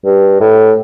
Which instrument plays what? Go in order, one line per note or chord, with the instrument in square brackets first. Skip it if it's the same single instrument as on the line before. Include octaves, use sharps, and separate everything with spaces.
[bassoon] G2
A2